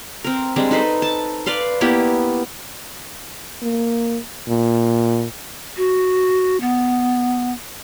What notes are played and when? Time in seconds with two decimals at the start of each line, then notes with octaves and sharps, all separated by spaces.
0.24 C4 A#4
0.56 G3 G#3 C4 D4
0.71 D#4 A4 B4 C5
1.02 A5
1.46 B4 D5 F5 C6
1.81 A#3 B3 E4 G4
3.62 A#3
4.49 A#2
5.77 F#4
6.61 B3